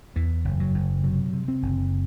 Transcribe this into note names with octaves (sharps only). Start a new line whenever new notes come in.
E2 E3
F#1
F#3
F#1
C3 F#3
C3
C4
F#1